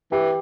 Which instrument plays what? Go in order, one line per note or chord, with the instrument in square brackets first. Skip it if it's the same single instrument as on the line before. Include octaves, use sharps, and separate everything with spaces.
[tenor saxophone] E3 [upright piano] G4